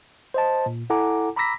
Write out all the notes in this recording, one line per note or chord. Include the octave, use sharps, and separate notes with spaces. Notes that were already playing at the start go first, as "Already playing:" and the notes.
C5 D#5 A5
A#2
E4 A4 F#5 G#5 A#5 D6
A#5 B5 D6 E6 A#6 B6